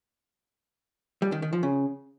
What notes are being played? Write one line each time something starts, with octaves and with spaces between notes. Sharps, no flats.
G3
D#3
D#3
F3
C#3